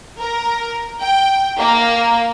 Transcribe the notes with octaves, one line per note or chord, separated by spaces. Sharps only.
A#4
G5
A#3